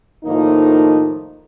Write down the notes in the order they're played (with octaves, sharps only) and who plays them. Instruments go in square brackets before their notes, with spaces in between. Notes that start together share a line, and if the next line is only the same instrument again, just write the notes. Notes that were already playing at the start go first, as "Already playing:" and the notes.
[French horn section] A2 D#3 F3 A#3 D#4